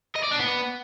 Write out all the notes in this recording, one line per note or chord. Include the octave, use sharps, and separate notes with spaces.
D#5
D5
D4
B3